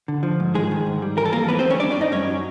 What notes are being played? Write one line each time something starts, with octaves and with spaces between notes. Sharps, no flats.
D3
F3
G#2
D#3 G#3 G#4
D#3
G#2
G3
E3 A#4
A4
F2 A#3 A#4
G3 B3 B4
C4 C5
D#3
C#4 C#5
G3 D4 D5
D4 D5
G2
D#4 D#5
F#2 C#4 C#5
F#3